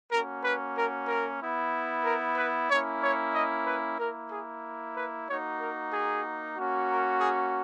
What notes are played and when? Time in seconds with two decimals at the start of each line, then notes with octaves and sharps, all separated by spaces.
0.11 A#3 C#4 F#4 A#4
0.43 B4
0.76 A#4
1.08 A#4
1.41 B3 E4
2.04 A#4
2.37 B4
2.70 A#3 C#4 E4 C#5
3.02 C#5
3.33 D#5
3.66 B4
3.99 A#3 E4 A#4
4.31 G#4
4.95 B4
5.27 A#3 D#4 F#4 C#5
5.59 A#4
5.92 G#4
6.56 A#3 C#4 F#4
6.88 A#4
7.20 G#4